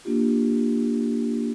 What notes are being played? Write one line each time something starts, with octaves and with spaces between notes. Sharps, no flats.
A#3 D4 F4 G4